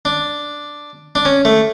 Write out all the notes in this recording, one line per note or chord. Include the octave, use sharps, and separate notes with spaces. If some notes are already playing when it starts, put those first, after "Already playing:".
D4
D4
C#4
A3